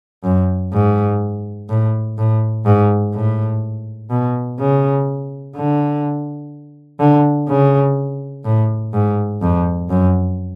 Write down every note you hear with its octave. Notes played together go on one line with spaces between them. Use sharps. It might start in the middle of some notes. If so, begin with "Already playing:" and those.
F#2
G#2
A2
A2
G#2
A2
B2
C#3
D3
D3
C#3
A2
G#2
F2
F#2